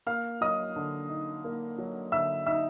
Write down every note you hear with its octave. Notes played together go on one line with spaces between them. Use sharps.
A#3 F5 F6
F#3 D#5 D#6
D3
D#4
A#3
F#3
D3 E5 E6
D#4 E5 E6